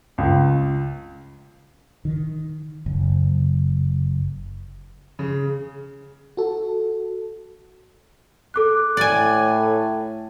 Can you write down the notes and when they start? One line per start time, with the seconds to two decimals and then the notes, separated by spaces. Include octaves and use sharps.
0.18 C#2
2.05 D#3
2.86 F#1
5.19 C#3
6.37 F#4 A4
8.54 A4 D6 F#6
8.97 A2 D5 G#5